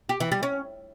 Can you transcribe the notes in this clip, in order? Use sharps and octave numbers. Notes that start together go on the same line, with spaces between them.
G4
E3
G3
C#4